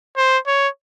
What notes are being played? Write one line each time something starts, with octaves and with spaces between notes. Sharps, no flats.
C5
C#5